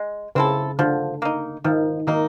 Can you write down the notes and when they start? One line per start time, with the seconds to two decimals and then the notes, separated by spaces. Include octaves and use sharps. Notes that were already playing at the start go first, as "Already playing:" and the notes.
Already playing: G#3
0.35 C#3 C4 E4 A4
0.79 D3 F3
1.22 A#3 D#4
1.64 D#3 F3
2.07 D#3 A#3 D#4